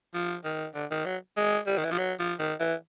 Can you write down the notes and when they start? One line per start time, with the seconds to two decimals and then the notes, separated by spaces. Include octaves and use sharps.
0.14 F3
0.45 D#3
0.75 D3
0.91 D#3
1.05 F#3
1.37 G#3
1.67 G3
1.78 D#3
1.84 E3
1.91 F3
1.98 F#3
2.19 F3
2.39 D#3
2.60 E3